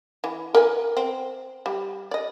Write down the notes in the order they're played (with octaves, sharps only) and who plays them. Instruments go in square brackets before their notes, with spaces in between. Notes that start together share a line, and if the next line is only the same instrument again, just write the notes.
[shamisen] E3
A#4 B4 G#5
C4
G3
D5 D#5